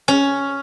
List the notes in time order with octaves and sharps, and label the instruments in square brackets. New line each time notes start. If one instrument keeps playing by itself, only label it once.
[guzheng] C#4